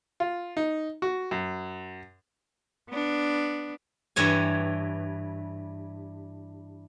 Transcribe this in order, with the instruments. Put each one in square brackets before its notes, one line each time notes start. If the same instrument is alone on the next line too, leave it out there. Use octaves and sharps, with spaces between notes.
[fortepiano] F4
D#4
F#4
F#2
[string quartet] B3 D4
[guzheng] G2 E3 C#5 G#5